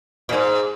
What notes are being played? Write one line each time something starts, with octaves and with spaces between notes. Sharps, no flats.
A#2
G#2